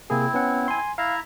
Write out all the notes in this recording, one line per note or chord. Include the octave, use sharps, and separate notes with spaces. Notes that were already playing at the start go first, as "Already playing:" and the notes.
C3 A#3 C4 E4 G#4
B3 C#4 F#5
G#5 C6
E4 E5 F5 A#5